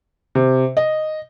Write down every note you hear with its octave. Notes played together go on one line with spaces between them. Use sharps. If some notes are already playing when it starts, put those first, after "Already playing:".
C3
D#5